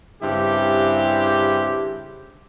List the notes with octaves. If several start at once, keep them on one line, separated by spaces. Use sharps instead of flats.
G2 C#3 C4 E4 G4